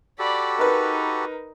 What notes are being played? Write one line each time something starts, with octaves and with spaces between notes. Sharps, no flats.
F#4 G4 A4 D5 B5
D#4 A#4 B4